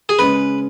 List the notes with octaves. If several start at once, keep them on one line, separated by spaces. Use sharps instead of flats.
G#4
C#3 G#3 C#4 B4